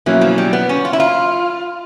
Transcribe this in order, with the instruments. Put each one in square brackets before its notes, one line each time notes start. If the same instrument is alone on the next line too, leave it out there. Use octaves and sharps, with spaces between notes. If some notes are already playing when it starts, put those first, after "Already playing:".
[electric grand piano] B2 F#3 A#3 C#4 E4 [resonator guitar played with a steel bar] E3
[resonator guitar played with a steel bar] F3
G3
B3
C#4
F4
E4
F4